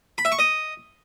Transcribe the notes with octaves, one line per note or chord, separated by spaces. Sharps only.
B5
E5
C#6
D#5